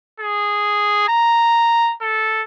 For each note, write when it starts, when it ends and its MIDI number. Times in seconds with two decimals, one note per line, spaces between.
0.20 1.08 68
1.09 1.94 82
2.02 2.42 69